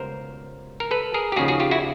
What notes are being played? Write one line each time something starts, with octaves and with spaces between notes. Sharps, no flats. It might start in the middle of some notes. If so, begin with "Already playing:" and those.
Already playing: C#2 B2 G3 B3 A#4 C5
A#4
A4 B4
G#4 A#4
G4
D#2 C#3 F3 F#4 G#4
F#4 G#4
F4 G4
E4 F#4